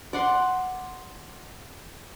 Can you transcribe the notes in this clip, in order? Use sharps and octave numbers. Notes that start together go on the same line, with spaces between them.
D5 F#5 C6